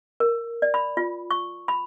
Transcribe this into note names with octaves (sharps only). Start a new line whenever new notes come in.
A#4
D5
B5
F4
C#6
B5